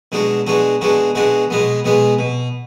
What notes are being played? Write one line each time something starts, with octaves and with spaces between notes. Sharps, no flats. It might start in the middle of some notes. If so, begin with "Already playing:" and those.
B2 G#3 D4 F#4
B2 G#3 D4 F#4
B2 G#3 D4 F#4
B2 G#3 D4 F#4
B2 G#3 B3
B2 G#3 B3
B2